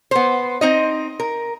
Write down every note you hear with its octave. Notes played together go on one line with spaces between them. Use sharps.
B3 C5
C4 D#4 D#5
A#4